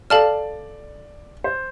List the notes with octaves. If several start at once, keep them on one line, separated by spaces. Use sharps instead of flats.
A4 D5 F5 A5 F6
C5